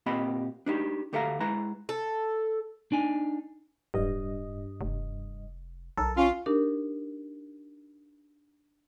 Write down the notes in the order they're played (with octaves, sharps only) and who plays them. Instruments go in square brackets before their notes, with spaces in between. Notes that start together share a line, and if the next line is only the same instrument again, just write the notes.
[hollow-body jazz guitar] A#2 C4 G4 D#5 B5
D4 D#4 G4
D2 G4 A4 E5 F5 A#5
G#3 E4 B4 A#5
[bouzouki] A4
[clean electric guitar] D4 D#4 G#5
[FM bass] D1 [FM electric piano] G2 D#5
[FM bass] F1
[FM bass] B1 [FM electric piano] A4 A#4
[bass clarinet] C#4 [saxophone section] F4 [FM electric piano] C6
[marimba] D4 D#4 G4 A#4